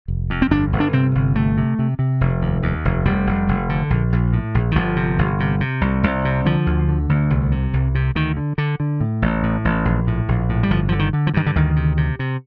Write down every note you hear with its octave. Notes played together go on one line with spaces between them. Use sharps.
F1
F2
C4
G1 D4
G1
D4
C3 C4
G1
C3 A3
C3
C3
C3
F1
D#2
D#2
F1
F1 G3
F1
F1
D3
A#1
A#1
A2
A#1
D#3
G1 F3
C3
G1
C3
C3
C2
C2
C3
D3 F3
D2
D3
D2
C2
C3
C2
C3
D2 D#3
D3
D3
D3
A2
A1
A2
A1
A#1
A2
A#1
A2
G3
G1 F3
D3 F3
D#3
D3
F3
G2 D#3
D3
D2 D#3
C3
C3
C3